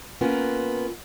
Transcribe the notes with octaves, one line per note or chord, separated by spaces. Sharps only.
A#3 B3 C#4 F4 A#4